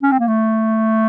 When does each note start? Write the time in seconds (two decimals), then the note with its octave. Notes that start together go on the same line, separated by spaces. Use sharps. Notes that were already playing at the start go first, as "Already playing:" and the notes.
0.03 C#4
0.12 C4
0.19 A#3
0.27 A3